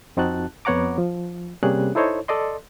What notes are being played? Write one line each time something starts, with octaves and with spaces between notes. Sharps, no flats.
F2 C4 D#4 F#4 A5 F#6
F2 B3 C#5 F#5 A#5 D6
F3
C3 G3 A#3 C#4 G#4 F#6
D#4 E4 A4 C5 C#5 D#5
A4 D5 D#5 C6